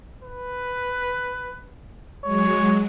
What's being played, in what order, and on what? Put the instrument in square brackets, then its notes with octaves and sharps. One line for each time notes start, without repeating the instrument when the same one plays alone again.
[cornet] B4
[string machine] F#3 G#3 [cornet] C#5